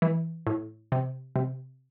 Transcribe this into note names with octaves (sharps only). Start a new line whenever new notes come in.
E3
A2
C3
C3